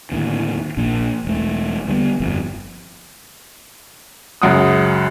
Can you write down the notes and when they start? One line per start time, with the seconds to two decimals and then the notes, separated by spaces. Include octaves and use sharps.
0.12 D#2 A2 D3
0.77 A#1 A#2 D4
1.25 E1 A3
1.88 D3 G3 A3 B3
2.20 G1 F2
4.42 C#2 F#2 F#5 D#6